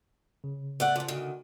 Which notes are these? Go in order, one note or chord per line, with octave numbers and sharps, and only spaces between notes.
C#3
A3 D5 F#5
A#2 F3
D2 D#3